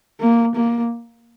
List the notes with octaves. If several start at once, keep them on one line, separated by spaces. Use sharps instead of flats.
A#3
A#3